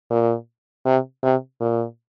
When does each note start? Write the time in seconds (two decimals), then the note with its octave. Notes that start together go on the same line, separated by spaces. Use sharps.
0.10 A#2
0.86 C3
1.23 C3
1.60 A#2